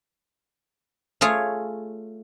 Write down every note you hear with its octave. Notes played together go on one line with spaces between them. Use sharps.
A3 F4 G#4 C#5